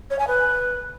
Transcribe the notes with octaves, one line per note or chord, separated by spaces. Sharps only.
C#5
G#5
B4